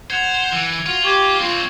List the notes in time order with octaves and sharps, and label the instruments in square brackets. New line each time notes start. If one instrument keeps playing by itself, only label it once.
[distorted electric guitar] C5 [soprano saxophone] F#5 [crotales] G#6 C#7 F7
[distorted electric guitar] E3
[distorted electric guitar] F4 [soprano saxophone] F#4 [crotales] D#7
[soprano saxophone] G4 [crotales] C#6 G#6 F#7
[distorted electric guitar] C4 D4 [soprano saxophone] F4